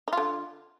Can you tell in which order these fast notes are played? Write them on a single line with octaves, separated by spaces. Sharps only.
D#4 F4 D3